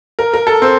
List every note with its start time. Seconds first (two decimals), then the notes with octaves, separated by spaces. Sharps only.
0.19 A#4
0.34 A#4
0.47 A4
0.62 C4